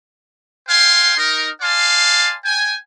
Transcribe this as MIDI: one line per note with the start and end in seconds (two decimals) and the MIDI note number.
0.69 1.16 72
0.69 1.16 77
0.69 1.16 79
0.69 1.16 80
0.69 1.16 84
1.18 1.49 63
1.18 1.49 70
1.62 2.36 74
1.62 2.36 77
1.62 2.36 80
1.62 2.36 81
1.62 2.36 84
2.45 2.76 79
2.45 2.76 80